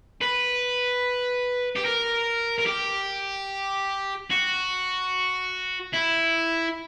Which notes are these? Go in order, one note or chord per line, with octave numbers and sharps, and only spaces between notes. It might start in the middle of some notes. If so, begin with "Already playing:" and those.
B4
G4
A#4
A#4
G4
F#4
E4